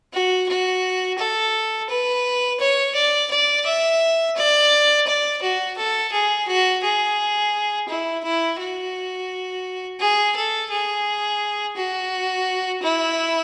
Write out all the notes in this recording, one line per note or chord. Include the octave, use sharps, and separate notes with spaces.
F#4
F#4
A4
B4
C#5
D5
D5
E5
D5
D5
F#4
A4
G#4
F#4
G#4
E4
E4
F#4
G#4
A4
G#4
F#4
E4